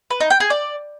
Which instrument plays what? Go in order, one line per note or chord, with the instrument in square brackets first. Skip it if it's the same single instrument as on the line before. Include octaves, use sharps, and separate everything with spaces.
[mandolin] B4
D#4
G5
G#4
D5